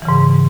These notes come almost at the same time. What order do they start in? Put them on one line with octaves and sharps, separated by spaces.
E3 C#3 G#2